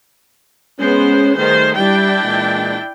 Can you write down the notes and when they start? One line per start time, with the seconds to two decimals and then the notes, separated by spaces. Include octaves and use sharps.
0.80 G#3 B3 C#4 C5
1.37 D#3 G3 A3 G#4 C5
1.77 G3 D4 E4 G5
2.23 A#2 E3 G#3